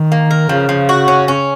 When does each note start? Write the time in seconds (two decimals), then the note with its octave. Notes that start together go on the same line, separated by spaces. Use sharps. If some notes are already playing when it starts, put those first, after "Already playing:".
Already playing: D#3
0.12 A#3
0.31 A#4
0.49 C#3 F3
0.69 F3
0.89 F#4
1.08 C#4
1.28 C#4